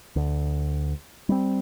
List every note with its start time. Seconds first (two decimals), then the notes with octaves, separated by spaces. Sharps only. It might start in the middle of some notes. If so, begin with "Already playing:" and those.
0.16 D2
1.29 G3 C4